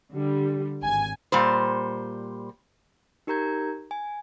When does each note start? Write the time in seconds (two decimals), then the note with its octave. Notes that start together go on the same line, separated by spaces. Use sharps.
0.12 D3 G3
0.83 G#1 G#5
1.32 A#2 G3 C5
3.27 D#4 G4 A#4 A#5 G6 G#6
3.91 G#5